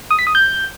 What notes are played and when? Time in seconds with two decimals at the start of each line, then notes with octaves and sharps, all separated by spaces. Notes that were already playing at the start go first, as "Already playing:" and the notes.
0.11 D#6
0.19 B6
0.27 D#6
0.35 G6